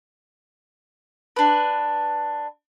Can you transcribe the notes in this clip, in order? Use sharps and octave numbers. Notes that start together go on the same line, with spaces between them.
D4 B4